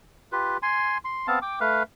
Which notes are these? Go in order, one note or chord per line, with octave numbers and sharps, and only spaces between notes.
F4 G4 B4
G#5 C6
C6
B3 C4 F5 A5
G5 D6
A3 B4 F5